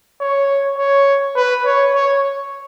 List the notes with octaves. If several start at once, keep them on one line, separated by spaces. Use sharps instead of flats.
C#5
C#5
B4
C#5
C#5